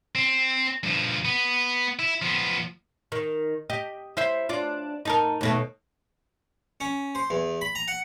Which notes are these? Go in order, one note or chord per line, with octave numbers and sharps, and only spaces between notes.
C4
G2 F3
B3
E4
F3 B3
D#3
G4 D#5
E4 C5 E5
D4 F4
D#4 A4 A#4
D#2 B2 A3
C#4
C5
E2
B5
A#5
F#5